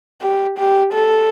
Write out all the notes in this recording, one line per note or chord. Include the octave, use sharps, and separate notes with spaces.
G4
G4
A4